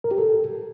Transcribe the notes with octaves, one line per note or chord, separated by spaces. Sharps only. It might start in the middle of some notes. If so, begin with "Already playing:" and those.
A#4
G4
A4